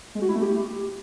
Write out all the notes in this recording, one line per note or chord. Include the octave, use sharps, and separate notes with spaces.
G#3
F#4
E4
A3
G4